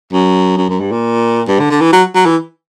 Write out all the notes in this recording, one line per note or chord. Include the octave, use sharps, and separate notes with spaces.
F#2
F#2
F#2
G2
A#2
G2
D3
D3
E3
F#3
F#3
E3